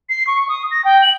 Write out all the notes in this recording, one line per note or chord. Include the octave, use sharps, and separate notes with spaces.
C7
C#6
D#6
A#6
G5
F#7